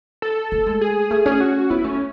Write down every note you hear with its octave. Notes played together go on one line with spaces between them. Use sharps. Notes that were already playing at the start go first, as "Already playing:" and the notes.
A4
A3
G#3
G#4
A3
C#4
G#4
F#4
B3 E4
A3 C#4